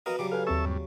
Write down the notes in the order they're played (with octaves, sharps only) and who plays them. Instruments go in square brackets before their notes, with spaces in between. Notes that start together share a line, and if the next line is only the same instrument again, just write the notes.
[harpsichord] B3 F#4 B4 [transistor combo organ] A#4 D#5 F5
[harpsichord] C#3 F#3 G3 [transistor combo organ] D6
[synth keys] A4 B4 G#5 [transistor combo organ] F5
[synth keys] D#2 C4 C#6 [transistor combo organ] A4 E5 E6
[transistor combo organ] G2